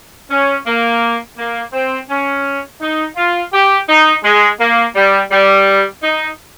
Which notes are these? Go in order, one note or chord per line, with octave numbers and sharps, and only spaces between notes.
C#4
A#3
A#3
C4
C#4
D#4
F4
G4
D#4
G#3
A#3
G3
G3
D#4